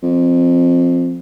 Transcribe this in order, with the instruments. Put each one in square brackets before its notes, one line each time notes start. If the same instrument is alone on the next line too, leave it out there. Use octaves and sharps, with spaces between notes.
[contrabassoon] F2